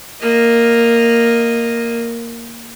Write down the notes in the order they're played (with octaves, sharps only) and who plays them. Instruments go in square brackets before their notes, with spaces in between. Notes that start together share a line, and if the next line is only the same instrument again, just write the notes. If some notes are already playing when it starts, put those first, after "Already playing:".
[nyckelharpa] A#3 D#5